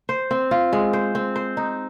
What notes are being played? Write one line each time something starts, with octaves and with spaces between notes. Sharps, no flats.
C5
C4
F4
G#3
C5
C4
C5
D#4